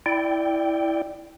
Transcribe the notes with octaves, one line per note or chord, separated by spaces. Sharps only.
E4 D5 G5